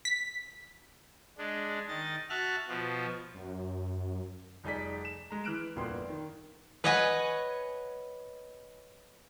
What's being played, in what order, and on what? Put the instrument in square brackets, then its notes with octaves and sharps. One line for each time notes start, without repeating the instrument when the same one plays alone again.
[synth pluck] B6
[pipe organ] G#3 D4
D#3 D#5 A6
F#4 E5 A5 F6 F#6
B2 F3
[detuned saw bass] F#2
[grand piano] F1 G3 D#4 G#4 D5 B6
E7
G#3 A#5
E3 F6 F#6 D7 E7
G1 F2 A#2 B3 C6
D#3
[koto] B4 C#5 D#5 F#5 G#5